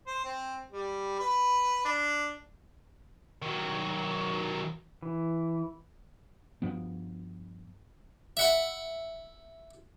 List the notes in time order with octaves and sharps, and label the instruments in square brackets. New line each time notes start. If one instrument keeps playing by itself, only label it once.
[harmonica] C5
C4
G3
B4
D4
[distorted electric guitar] D#3 F#3
[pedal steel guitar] E3
[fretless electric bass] G2 F3 B3
[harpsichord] E5 F#5 B5